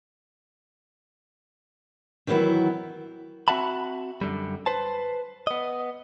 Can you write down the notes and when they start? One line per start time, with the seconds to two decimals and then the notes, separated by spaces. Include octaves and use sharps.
2.27 D#3 E3 F#3 B3 E4
3.48 C4 F#4 E5 F#5 A5 B5
4.21 F#2 D3 G3
4.66 B4 C5 A5
5.47 B3 D#5